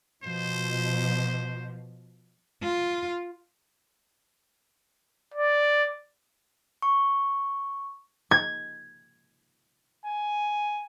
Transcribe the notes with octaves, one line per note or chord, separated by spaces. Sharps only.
B2 F3 C5
F4
D5
C#6
G#6
G#5